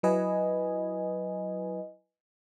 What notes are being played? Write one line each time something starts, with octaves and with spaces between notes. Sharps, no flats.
F#3 E4 B4 D#5 G#5